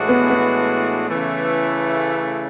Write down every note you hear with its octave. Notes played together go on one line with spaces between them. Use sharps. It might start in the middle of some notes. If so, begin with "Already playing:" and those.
Already playing: A2 E3 G#3 D4 F#4
B3
B3
C#3 E3 A3